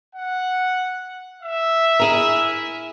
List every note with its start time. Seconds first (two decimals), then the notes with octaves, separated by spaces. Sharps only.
0.15 F#5
1.42 E5
1.99 E4 G#4 A#4